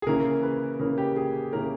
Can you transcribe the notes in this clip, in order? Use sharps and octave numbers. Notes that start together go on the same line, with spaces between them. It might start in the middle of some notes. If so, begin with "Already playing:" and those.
G#4
C#3 E3 A#3 C#4 A#4
B4
C#3 E3 A#3 C#4 A#4
G4
G#4
C#3 E3 A#3 C#4 A#4